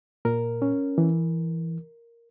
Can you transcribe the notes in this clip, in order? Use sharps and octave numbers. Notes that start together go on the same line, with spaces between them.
A#2 A#4
C#4
E3